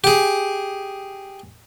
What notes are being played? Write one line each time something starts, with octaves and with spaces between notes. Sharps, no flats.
G4 G#4